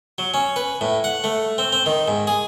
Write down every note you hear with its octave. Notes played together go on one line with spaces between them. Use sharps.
F#3
C#4
B4
A2
F#5
A3
C4
C4
D#3
G#2
G#4